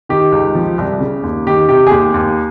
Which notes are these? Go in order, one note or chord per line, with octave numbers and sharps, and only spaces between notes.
D#3 G4
C#2
F3
C2
C#3
D#2
D#3 G4
C3 G4
G#4
D#2 G4
D#2